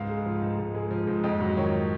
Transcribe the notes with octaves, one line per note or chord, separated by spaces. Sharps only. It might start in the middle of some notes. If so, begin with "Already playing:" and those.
Already playing: C#2 G#2 F5
G#3
F3
G#2
G#2
G#3
F3
G#2
F2 D#5
F#3
D#3 C#5